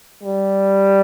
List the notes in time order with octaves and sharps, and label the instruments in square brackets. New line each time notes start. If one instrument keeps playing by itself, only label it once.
[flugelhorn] G3